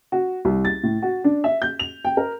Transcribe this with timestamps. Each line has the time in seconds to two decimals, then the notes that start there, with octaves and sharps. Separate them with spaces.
0.12 F#4
0.45 C2
0.65 A6
0.83 A2
1.02 F#4
1.24 D4
1.44 E5
1.62 G6
1.79 F7
2.05 G5
2.17 A#4